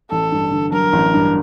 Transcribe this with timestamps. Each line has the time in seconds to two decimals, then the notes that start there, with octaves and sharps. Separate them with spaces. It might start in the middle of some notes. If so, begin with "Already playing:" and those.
0.11 A1 A4
0.32 G2
0.51 D3
0.72 F#3 A#4
0.93 A1
1.14 G2